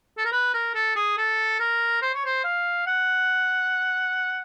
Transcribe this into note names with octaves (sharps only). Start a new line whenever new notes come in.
A4
A#4
B4
A#4
A4
G#4
A4
A#4
C5
C#5
C5
F5
F#5